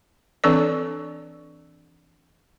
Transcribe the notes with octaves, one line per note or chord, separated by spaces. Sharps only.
E3 C4 D4 A4 B4 D5